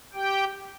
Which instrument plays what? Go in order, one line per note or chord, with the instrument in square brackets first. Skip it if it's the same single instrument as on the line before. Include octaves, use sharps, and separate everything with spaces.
[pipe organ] G4 G5